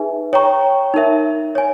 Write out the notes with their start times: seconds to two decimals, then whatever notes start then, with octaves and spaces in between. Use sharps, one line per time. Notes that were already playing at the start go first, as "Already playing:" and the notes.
Already playing: D#4 G#4 B4 E5 G#5
0.33 C#5 G5 A#5 C#6
0.94 D#4 A#4 E5
1.55 C#5 G#5